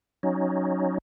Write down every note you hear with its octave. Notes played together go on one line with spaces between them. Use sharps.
F#3 C#4 D#4